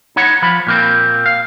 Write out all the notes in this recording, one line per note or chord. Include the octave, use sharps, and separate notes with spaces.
D#4 C#5 F#5 B5
F3 B5
A#2 A#3 C4
F5